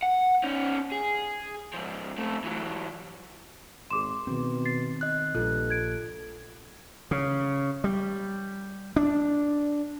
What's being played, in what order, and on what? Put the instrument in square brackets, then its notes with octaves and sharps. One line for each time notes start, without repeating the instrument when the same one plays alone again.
[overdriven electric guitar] F#5
C#4 D#4
G#4
G#2 F3
A3 C4
E3 F#3
[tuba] G#1 [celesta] G#4 D6 E7 [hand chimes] C6
[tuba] B2 [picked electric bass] D#3 C4
[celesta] A6 C7
[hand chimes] D#5 F#6
[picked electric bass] A#1 A#2 [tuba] G2 [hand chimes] F4 A4 F#6
[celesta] G#6 D7
[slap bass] C#3
G3
D4